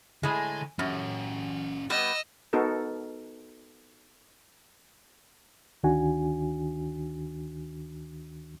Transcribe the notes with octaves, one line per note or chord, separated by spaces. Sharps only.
A2 D3 G#3 G#5
F#2 C#4 G4
G3 B3 D#5 E6
B3 D#4 F#4 A4 A#4
D2 D#3 D4 F#4 G#5